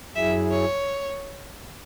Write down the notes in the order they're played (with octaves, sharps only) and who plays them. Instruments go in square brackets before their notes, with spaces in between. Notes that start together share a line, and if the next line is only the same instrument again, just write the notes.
[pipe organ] F#2 F#3 E4 G#4 [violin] E5
[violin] C#5